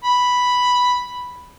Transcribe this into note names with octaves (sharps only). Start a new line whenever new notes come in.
B5